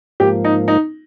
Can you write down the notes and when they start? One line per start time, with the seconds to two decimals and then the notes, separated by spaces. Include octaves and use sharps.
0.20 G#2 F3 A#3 G4
0.44 D#4
0.68 D#4